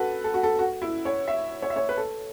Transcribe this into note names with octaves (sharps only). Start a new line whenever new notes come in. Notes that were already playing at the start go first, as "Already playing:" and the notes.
Already playing: F#4 A4 B4
A4
F#4
A4
F#4
E4
C#5
E5
C#5
E5
C#5
B4
A4